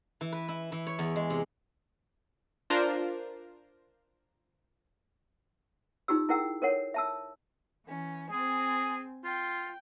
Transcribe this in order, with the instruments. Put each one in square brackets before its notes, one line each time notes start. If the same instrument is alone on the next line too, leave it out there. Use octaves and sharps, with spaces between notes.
[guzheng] E3
B4
E4
E3
C#5
E2
G#3
C3
[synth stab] D4 F4 A#4 C5
[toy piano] D#4 F4 G4 E6
E4 G#4 A#4 F#5 G5 E6
A4 A#4 C#5 F#5
E5 A5 E6
[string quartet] E3 C#4
[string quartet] C4 G#5 [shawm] G#4
[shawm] F4 [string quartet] G5